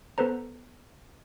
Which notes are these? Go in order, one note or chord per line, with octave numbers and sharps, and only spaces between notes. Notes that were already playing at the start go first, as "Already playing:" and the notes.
B3 A4 B4 C5 A#5